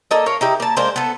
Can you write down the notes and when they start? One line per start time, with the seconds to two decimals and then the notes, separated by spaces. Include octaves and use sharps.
0.11 A#3 A4 D#5
0.26 A#4 C#5 F5
0.41 D#4 E4 G4
0.60 A#3 A5
0.77 G#3 A#3 D4 C5
0.96 B3 A4